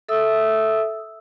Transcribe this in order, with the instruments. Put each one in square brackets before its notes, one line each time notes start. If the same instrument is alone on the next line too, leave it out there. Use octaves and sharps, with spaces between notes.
[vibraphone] A4 E5 D#6 E6